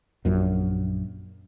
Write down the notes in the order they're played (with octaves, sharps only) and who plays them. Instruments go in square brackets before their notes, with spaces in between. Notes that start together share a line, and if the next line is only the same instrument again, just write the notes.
[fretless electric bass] A#1 F#2 A#2